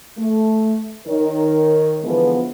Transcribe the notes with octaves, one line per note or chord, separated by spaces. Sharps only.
A3
D#3 A#4 C#5
D3 E3 F3 G#3 B3